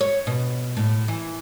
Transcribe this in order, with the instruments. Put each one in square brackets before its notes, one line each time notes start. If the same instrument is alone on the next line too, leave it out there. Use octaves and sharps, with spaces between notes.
[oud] C#5
B2
A2
E3